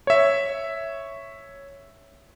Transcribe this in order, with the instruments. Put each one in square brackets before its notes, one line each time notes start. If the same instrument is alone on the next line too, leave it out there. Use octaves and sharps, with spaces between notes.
[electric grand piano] C#5 E5